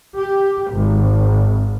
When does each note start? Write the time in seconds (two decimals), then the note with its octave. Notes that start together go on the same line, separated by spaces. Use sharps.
0.18 G4
0.72 G#1